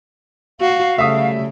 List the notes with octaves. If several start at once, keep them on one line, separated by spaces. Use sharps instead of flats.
F#4 F5
C#3 F#3 G3 A3 E5 D#6